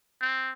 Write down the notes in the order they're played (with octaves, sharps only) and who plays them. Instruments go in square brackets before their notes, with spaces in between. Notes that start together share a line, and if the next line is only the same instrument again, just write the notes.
[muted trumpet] C4